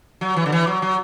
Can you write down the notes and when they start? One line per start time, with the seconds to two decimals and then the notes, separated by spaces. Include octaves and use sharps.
0.21 F#3
0.36 E3
0.46 D3
0.52 E3
0.67 F#3
0.82 F#3